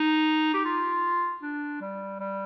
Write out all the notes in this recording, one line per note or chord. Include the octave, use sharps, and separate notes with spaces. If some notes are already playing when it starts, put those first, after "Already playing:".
Already playing: D#4
G4
F4
D4
G3
G3